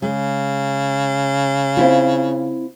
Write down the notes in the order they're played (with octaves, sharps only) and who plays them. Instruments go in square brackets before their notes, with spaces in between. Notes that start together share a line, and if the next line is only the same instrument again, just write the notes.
[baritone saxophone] C#3 [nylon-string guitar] G#3
[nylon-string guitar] C4 E4 F4